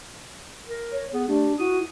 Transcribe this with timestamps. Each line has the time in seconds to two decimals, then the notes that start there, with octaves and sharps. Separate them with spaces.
0.66 A#4
0.92 C#5
1.13 B3 G#4
1.28 A3 D4 G4
1.59 E4 F#4 D#6